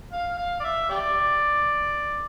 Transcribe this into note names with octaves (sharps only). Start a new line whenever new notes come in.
F5
F5
D5
E5
G4 D5